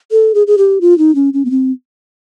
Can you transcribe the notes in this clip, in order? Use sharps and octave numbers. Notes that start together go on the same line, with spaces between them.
A4
G#4
G#4
G4
F4
D#4
C#4
C#4
B3
C4